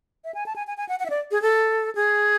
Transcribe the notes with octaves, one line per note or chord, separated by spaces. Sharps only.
E5
G#5
A5
G#5
G#5
G#5
F#5
F#5
E5
D5
G#4
A4
G#4